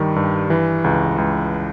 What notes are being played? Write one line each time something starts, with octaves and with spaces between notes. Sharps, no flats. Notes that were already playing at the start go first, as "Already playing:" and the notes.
Already playing: G2 D#3 G3
G2
E3
C#2
C#2